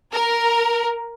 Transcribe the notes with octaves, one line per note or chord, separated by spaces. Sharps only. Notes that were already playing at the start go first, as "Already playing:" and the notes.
A#4